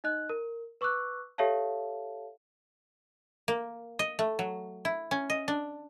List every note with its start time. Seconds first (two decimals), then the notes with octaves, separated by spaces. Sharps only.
0.04 D#4 D#5 F#6
0.29 A#4
0.81 B4 C#6 D6 E6 F#6
1.38 G4 A4 C#5 E5 F5 A5
3.48 A#3
3.99 D#5
4.19 A3
4.39 F#3
4.85 E4
5.11 C#4
5.30 D#5
5.48 D4